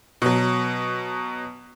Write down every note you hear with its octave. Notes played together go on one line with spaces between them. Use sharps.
B2 F#3